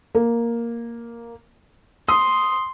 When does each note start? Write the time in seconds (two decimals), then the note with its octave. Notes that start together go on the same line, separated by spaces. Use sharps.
0.15 A#3
2.08 C6 D#6